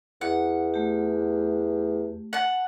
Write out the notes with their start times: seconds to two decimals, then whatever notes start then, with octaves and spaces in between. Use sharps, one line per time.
0.21 E2 F#5
0.74 A3 G4
2.33 F#5 A5